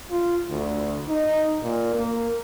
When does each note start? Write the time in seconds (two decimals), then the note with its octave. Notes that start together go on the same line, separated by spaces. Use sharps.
0.11 F4
0.51 D2
1.08 D#4
1.63 A#2
1.94 A#3